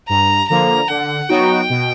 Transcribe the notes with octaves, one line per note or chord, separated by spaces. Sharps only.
G2 A#5
D3 F3 A#3 A#5
D3 F#5
F#3 B3 D#4 F#4 G5
B2